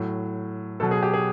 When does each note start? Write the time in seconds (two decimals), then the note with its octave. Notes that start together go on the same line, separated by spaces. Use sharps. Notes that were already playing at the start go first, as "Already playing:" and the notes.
Already playing: A2 F#3
0.80 B2 F#3 A4
0.91 G#4
1.03 G4
1.13 G#4